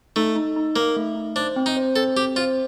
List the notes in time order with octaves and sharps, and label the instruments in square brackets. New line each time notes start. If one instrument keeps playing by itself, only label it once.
[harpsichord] A3 [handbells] D#4
[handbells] D#4
D#4
[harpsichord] A#3 [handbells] D#4
[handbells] A3
D#4
[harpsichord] D4 [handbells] C5
[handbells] C4
[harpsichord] D#4
[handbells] C5
[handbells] C4 [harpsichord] A4
[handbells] C4 [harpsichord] G4
[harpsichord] F4 [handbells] C5